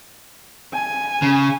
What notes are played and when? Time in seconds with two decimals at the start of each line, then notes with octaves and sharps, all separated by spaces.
0.73 G#5
1.22 C#3